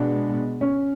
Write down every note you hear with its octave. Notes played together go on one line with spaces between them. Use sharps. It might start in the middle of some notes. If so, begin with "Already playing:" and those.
Already playing: B2 G#3 B3 D4
C#4